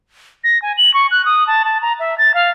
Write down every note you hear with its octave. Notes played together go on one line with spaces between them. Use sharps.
A#6
G#5
F#7
C#6
F#6
D#6
A5
A5
A#5
E5
A6
F5